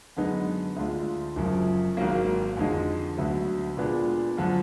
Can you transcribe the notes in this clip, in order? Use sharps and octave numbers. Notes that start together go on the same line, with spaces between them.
F#2 D3 G#3 B3 D#4
D2 D3 G#3 D4 F4
F#1 F#2 F3
G#1 G#2 F#3 A#3
F2 D3 G#3 D#4
D2 D3 F#3 B3
A#2 G#3 B3 D4
F#2 D3 F3